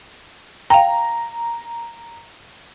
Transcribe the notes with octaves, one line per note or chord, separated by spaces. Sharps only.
F5 G5 A#5